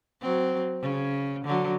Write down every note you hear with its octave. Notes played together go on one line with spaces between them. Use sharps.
F#3 C4
C#3
D3 F#3